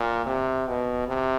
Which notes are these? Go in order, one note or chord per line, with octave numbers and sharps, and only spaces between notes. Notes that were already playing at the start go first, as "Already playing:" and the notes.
Already playing: A#2
C3
B2
C3